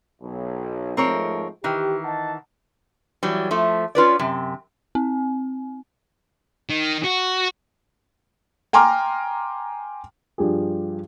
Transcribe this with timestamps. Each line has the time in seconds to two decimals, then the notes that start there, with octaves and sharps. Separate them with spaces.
0.21 B1
0.97 G#2 F3 A3 C4 A#4 C#5
1.64 D#3 E3 G4
2.05 D#5 F#5 A5
3.23 E3 F#3 G3
3.51 F3 A3
3.95 C#4 F4 B4 D5
4.19 F#2 C3
4.95 C4
6.70 D#3
7.05 F#4
8.73 G5 G#5 A#5 C6 D6 F6
10.38 G2 F3 G4 G#4